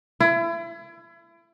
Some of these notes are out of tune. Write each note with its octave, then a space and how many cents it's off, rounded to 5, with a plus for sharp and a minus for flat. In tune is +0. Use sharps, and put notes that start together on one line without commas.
E4 +35